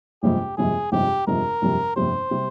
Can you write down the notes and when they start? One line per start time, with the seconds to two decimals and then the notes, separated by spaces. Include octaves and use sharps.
0.23 G1 F2 C3 F3 G#3 G4
0.57 G1 F2 C3 F3 G#3 G#4
0.92 G1 F2 C3 F3 G#3 G4
1.27 G1 F2 C3 F3 G#3 A#4
1.62 G1 F2 C3 G3
1.96 G1 F2 C3 G3 C5
2.31 C3 G3